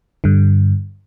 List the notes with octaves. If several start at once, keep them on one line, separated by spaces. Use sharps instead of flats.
G2 D3